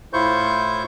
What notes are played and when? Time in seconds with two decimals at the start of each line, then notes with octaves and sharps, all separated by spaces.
0.13 A2 E4 F4 C5 C#6 G6